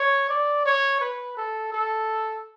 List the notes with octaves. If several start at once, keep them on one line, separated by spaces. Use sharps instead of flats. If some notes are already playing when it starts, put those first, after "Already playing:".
Already playing: C#5
D5
C#5
B4
A4
A4